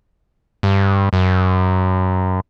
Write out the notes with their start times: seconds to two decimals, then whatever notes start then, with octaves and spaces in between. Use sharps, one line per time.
0.63 G2
1.13 F#2